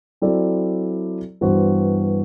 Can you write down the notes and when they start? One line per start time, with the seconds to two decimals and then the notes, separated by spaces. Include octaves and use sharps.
0.22 F#3 C4 E4 A4 D5
1.41 G2 E3 B3 F#4 C5